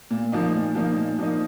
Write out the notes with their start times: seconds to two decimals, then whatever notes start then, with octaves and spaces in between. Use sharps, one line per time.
0.11 A#2
0.32 F3 A#3 D#4
0.54 A#2
0.75 F3 A#3 D#4
0.97 A#2
1.19 F3 A#3 D#4